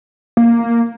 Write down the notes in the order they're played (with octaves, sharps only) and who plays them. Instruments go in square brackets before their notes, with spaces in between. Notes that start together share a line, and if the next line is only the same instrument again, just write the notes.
[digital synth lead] A#3